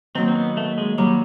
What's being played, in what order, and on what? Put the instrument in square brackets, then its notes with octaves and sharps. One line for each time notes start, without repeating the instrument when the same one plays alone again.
[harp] D#3 F#3 A#3 D#4 [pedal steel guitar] C4
[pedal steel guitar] C4
B3
A3
G#3
[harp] D#3 F#3 A#3 D#4 [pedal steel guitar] G3